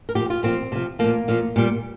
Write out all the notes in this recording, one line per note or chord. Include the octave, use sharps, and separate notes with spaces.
A#4
A#2 F3 G4
F4
A#2 F3 C4
C3 F3
A#2 F3 A#3
A#2 F3
A#2 G3